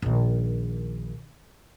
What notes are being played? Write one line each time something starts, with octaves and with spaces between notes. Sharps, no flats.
A#1 D#3